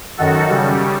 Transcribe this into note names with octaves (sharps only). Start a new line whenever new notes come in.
F#2 D#3 F#4 A4
C#3 G3